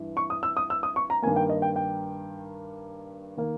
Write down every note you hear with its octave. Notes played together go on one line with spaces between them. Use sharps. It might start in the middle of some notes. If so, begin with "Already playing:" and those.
Already playing: G2 E3
C#6
D#6
E6
D#6
E6
D#6
C#6
A#5
G2 D#3 A#3 G#5
G5
D#5
G5
G5
D#3 A#3